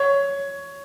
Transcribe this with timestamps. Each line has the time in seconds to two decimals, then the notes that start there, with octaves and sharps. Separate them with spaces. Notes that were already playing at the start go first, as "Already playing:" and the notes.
Already playing: C#5